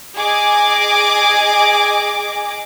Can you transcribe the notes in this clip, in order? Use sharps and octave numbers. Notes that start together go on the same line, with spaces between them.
G#4 D#5 G#5 D6